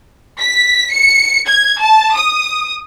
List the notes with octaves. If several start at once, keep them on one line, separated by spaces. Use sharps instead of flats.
B6
C#7
G#6
A5
D#6